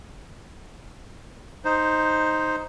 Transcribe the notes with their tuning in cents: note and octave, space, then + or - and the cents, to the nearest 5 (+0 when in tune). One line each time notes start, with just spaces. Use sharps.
D#4 +0 C5 +0